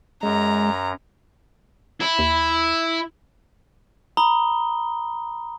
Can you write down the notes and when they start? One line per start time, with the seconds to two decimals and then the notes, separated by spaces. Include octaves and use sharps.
0.23 F#2 G#3 A#5
2.00 E4
2.19 D#2
4.17 A#5 B5 D#6 G7